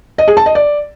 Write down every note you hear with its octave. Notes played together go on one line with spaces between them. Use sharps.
D#5
G#4
A5
D#5
D5